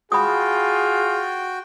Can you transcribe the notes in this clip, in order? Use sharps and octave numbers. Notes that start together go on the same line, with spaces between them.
F4 F#4 G#4 G5 B5 D#6